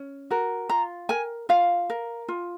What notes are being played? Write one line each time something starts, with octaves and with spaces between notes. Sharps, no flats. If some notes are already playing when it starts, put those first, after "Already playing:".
Already playing: C#4
F#4 A#4
F4 A#5
A#4 G#5
F4 F5
A#4
F4